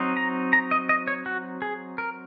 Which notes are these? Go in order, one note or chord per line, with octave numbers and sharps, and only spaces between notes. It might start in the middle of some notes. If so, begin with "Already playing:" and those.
Already playing: F#3 C4 D#4
A#5
A#5
D#5
D#5
C#5
F#4
G#4
A#4